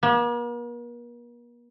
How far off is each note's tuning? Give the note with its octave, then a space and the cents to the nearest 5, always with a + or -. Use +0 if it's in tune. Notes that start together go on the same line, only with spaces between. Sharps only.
A#3 +45